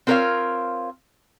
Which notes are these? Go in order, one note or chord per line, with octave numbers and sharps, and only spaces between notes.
C4 F4 A#4 B4 C#5 F5